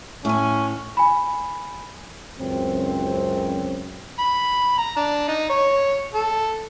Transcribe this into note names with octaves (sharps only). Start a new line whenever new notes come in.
A2 C#4 G#5
G#5 B5
C#2 F#2 C4
B5
A#5
D4
D#4
C#5
A4